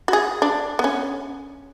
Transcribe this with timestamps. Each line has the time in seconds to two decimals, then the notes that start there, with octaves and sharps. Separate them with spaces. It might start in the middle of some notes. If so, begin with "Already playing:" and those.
0.08 F#4
0.13 G#4
0.42 D4
0.79 B3
0.84 C#4